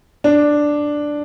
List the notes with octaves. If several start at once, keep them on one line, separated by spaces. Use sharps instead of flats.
D4